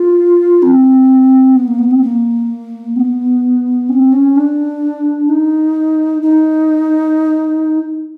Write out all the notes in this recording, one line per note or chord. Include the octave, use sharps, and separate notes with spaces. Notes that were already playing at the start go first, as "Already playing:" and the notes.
Already playing: F4
C4
B3
A#3
B3
C4
A#3
C4
B3
C#4
C4
C#4
D4
D#4
D#4